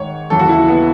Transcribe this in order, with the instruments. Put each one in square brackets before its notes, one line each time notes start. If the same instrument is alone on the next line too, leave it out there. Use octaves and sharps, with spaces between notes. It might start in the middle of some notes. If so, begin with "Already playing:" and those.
Already playing: [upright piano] G#2 D#3 C#5
D#2 C#3 E3 A4
F#4
E4
B3